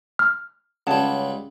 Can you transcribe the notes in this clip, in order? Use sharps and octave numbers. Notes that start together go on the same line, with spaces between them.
F6
C#2 G3 C#4 C#5 F#5 A5